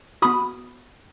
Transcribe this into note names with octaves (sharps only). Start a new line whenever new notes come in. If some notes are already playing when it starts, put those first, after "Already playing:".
B3 F#4 B5 D#6